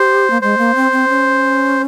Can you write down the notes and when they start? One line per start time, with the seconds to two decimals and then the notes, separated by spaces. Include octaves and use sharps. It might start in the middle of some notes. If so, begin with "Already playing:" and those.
Already playing: G4 C5
0.30 A#3
0.42 G#3 C5
0.58 A#3
0.75 C4
0.92 C4
1.09 C#4